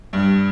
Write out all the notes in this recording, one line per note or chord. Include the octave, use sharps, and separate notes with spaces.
G2